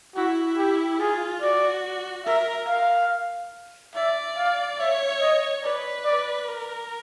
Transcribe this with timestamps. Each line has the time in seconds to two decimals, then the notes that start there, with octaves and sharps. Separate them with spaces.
0.16 E4 F#4
0.58 G4
1.00 F4 G#4
1.42 F#4 D5
2.26 A#4 E5
2.68 F5
3.96 D5 E5
4.38 F5
4.80 C#5 E5
5.21 D#5
5.63 B4 D5
6.05 D5
6.48 A#4